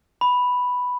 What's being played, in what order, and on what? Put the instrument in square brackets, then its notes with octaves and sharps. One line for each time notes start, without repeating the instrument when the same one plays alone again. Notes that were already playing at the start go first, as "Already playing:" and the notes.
[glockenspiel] B5